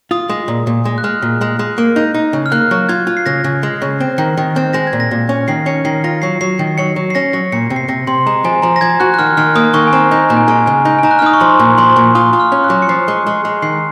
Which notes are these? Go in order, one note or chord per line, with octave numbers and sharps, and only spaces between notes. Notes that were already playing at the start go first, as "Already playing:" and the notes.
F4 D#6
G#3
A#2
A#2
G#3
F#6
G#3 F6
A#2
G#3
G#3
A#3
D#4
D#4
C#3
F6
A#3 F#6
F#3
F4 G#6
F4
C7
C#3 A#6
C#3
G#3
C#3
C4
D#3
D#3
C4
G#3 A#6
G#6
A#2
A#6
A#2
C#4
D#3 C7
C#4 C#7
D#3 C7
F4 A#6
F#3 C7
F#3 C7
D#3
F#3 C#7
F#3
C7
C#4 A#6
F#3 A#6
A#2 C#7
C3
C7
C3 A#6
C3 C6
G#3 A#5
F3 G#5
F3 A#5
A#6
F3 G#6
F#4 F#6
F#6
D#3 F6
D#3 F6
A#3 D#6
D#3 C#6
G#5
C4 A#5
D#4
A#2 A#5
G#5
G#3 G#5
C#3 G#5
D#4
G#5
D#4 A#5
F#6
F6
D#4 D#6
C#6
F3 C6
A#2
F3 C6
A#2
F4 D#6
F4
F6
C#4
F#6
F#3
C#7
F3 C7
G#3
G#3
G#3
D#3 C7